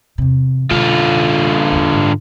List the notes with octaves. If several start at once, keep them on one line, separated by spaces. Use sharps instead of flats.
E2 C3
B2 D3 F4
E2 D#3
G#2